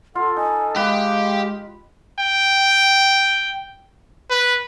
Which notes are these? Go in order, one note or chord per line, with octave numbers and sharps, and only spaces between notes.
F4 A4 F#5
D#4 G#5
G#3 G4 B4 F5
G5
B4